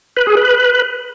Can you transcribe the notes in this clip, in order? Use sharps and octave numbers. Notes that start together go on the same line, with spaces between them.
B4
G#4
B4